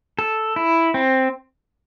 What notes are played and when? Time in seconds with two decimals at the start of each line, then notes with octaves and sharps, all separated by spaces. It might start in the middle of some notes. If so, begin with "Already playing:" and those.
0.19 A4
0.56 E4
0.94 C4